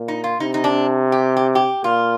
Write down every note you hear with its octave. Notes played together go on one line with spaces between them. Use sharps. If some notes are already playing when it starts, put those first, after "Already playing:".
Already playing: A#2
D#4
F4
C3 D#4
D#4
D4
G4
G4
G4
A#2 F4